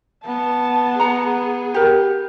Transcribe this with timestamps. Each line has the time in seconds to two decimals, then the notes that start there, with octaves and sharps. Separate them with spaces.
0.25 B3 A5
1.00 G#4 F#5 A#5
1.74 G4 A#4